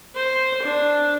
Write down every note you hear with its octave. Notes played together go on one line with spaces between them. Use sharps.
C5
D4